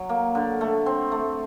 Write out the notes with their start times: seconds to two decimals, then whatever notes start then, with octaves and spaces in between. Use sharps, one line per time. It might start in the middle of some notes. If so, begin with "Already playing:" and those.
Already playing: F#3
0.09 A#3
0.35 D3
0.61 A3
0.86 C4
1.12 A3